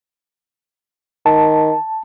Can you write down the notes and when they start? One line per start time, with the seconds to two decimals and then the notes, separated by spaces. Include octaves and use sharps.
1.26 D#3 A5